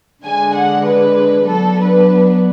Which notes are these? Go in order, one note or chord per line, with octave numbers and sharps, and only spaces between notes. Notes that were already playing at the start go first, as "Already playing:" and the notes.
D3 G#3 D4 G#5
F#5
B4
F#3 B3 D4 A4
B4